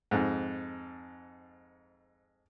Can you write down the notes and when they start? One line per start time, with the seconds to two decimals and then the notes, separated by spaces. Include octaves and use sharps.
0.11 F2 G#2